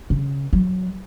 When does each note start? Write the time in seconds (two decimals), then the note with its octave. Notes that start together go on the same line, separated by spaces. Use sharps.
0.10 C#3
0.53 F#3